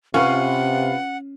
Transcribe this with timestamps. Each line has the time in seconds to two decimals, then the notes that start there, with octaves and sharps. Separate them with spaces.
0.14 C3 C#4 F4 B4 F5 F#5